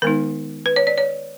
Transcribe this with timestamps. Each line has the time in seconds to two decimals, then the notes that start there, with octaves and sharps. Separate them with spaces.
0.02 D#3 G#3 B3 D#4 A#4
0.66 B4
0.76 C#5
0.87 D5
0.98 C#5